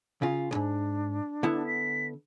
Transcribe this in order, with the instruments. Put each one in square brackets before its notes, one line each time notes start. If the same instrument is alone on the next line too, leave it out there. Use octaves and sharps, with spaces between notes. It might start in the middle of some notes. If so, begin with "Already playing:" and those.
[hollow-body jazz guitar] C#3 F4
[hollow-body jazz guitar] B1 G#2 [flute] D4
[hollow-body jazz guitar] D3 B3 E4
[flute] B6